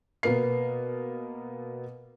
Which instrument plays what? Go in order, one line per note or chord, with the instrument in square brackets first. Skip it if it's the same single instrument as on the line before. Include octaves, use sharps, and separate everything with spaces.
[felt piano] B2 A#3 B3 A#4 C7